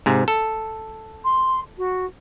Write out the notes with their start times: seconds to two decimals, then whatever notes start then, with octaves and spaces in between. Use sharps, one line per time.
0.06 G#2 C3
0.28 A4
1.25 C6
1.78 F#4